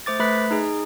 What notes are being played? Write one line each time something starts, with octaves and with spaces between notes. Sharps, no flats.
A3 C5 D6 A6
A3 B4 B5 F#6 B6
D#4 G#4